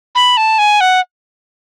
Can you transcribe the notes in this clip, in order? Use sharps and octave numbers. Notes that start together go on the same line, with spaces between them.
B5
A5
G#5
F#5